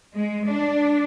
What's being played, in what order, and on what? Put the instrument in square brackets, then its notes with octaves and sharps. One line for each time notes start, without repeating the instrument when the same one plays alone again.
[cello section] G#3
D4